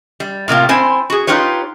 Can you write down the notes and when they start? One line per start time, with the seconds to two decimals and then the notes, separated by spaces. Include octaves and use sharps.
0.20 G3
0.48 A2 C3 A#3 F4
0.69 C4 E4 C5 G#5
1.10 F#4 G#4
1.27 D#4 F4 G4 B4 C#5